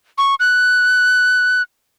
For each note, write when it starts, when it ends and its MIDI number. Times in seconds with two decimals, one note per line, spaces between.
0.18 0.35 85
0.40 1.62 90